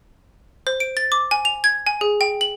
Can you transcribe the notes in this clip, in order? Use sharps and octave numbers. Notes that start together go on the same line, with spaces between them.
C5
D7
A6
D6
G#5
F7
G#6
G#5
G#4
G5
F#7